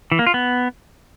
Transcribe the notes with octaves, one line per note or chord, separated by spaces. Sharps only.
E3
A#3
F4
B3